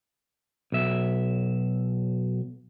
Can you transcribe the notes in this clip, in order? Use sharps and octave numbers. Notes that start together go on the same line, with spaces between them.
B1 E5